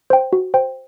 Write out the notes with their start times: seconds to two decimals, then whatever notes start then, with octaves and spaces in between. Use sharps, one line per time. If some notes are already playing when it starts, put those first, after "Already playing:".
0.10 C5 G5
0.33 F#4
0.54 C5 G5